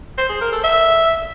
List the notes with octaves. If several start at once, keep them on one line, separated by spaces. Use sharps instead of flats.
C5
G#4
A#4
A4
E5